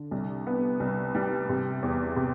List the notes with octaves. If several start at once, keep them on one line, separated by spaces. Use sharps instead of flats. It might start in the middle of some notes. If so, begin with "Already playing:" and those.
Already playing: D3
C2
B3
C2
G3
C3
E2
C3